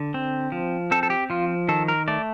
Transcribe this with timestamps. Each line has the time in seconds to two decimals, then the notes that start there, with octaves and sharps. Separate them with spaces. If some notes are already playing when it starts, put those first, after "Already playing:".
Already playing: D3
0.14 C4
0.52 F3
0.91 C4 A4
1.03 A4
1.10 G4
1.30 F3 F4
1.68 D#3 A4
1.88 A#4
2.08 A3 D5